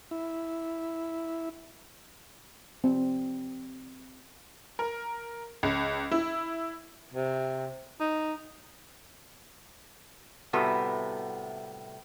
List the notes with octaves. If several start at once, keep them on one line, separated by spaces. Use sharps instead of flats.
E4
C4
A#4
C#2
E4
C3
D#4
A2 C3 G3 A3 B3 F#4